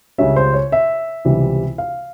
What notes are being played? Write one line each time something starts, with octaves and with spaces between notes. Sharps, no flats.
C#2 C#3 G3 C#4 E5
C5
C#5
E5
C#2 C3 E3 G3
F5